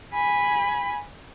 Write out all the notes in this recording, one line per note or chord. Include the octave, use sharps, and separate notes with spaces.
G#5 B5